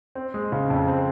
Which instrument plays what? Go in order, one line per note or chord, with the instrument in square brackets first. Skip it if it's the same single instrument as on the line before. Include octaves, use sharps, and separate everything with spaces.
[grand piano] C4
G#3
C#3
F2
C4